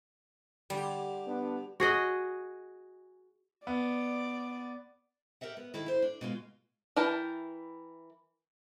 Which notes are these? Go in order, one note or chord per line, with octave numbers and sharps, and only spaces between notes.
D3 G3 G4
B3 D4
F#4 G#4 D#5
B3 D5
G4 A#4 D#5 E5 F#5
B3
D#3 E4 A4
E4 C5
D4
B2 G#3 F4
E3 E4 A#4 G5 A5